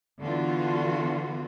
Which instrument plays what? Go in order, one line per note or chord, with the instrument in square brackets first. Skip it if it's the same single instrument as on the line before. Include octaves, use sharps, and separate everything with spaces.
[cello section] D3 E3 B3 F4 F#4